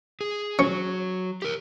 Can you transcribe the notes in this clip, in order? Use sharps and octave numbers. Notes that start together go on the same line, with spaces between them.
G#4
F#3 C#4
G4 A#4